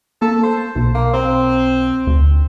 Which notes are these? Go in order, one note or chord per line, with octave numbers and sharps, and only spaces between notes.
A#3 A4
C5
B1
A#3
C4
D2